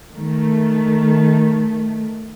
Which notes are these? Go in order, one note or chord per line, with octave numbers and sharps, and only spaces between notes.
D#3 A3